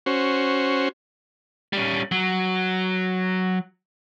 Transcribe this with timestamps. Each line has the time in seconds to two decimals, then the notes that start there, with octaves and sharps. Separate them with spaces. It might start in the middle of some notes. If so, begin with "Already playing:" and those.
0.06 C#4 F#4 C5
1.73 G3 C#4
2.12 F#3